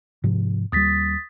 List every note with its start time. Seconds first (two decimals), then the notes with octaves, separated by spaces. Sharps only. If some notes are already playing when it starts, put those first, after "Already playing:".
0.24 G#2 C3 F3
0.72 D#2 G3 D#6 A6 B6